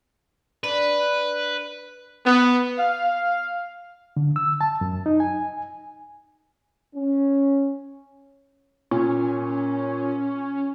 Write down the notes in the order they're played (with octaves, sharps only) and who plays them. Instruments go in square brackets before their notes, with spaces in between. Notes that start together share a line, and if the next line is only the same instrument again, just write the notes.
[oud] D4 [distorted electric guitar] B4
[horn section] B3
F5
[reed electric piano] D3
E6
A5
F#2
D#4
G#5
[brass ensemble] C#4
[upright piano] A#2 [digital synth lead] C#4